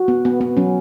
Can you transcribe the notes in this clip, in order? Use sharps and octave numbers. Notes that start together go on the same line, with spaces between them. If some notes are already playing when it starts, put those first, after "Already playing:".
Already playing: F#4
B3
B3
B3
F#3 C#4